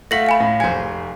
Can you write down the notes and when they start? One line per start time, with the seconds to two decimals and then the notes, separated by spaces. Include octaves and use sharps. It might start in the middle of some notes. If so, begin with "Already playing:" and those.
0.11 A3 F4 F#5 A#6 B6 F#7
0.26 F5 G#5 B5
0.40 A2
0.60 F1 G#4 B4 C5 G#5 G#6